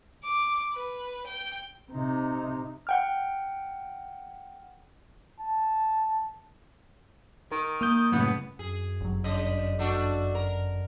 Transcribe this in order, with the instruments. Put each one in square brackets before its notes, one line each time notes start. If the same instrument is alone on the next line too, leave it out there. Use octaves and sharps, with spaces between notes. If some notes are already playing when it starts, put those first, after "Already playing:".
[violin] D6
B4
G5
[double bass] C3 D#4
[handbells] F#5 G5 F6
[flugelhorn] A5
[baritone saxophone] D#3 [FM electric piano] A#4
[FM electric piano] A#3 D#6 G6
[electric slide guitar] F#2 A2 C#3 [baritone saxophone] B3
[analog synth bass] F#2 [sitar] G#4
[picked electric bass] G1 F#3
[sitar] C#3 D4 D#5
A3 D4 F#4
A#4